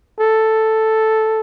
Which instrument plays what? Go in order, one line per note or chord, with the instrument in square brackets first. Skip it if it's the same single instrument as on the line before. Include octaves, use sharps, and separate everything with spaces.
[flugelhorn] A4